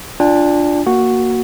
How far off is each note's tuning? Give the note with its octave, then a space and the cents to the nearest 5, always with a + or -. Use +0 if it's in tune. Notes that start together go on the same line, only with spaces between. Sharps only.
D4 +0 F4 +0 G#5 -45
A#3 +0 F#4 +0